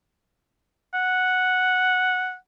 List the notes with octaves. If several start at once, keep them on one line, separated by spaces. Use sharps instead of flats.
F#5